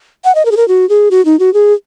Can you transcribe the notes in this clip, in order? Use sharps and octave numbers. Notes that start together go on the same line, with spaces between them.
F#5
D#5
A#4
G#4
A#4
F#4
G#4
F#4
D#4
F#4
G#4